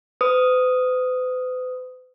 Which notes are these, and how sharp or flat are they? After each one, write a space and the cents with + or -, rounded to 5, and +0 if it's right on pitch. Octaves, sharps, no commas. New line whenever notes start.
B4 +45 D#6 +0